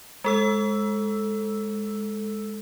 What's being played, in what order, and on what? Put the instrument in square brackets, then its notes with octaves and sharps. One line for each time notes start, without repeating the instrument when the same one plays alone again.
[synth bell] G#3 A4 E6